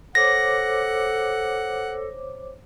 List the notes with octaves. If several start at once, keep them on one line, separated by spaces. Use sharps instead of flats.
A4 C5 C#5 F#5 D6 A#6